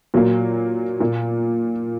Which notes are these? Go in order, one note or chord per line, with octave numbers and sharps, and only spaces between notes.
A#2 F#3 A#3
A#2 A#3